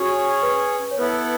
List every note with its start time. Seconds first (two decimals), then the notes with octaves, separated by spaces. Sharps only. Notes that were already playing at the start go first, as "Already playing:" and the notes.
Already playing: C#4 F#4 G#4 C#5
0.43 B4
0.91 C#5
0.98 B3 E4 A4 B4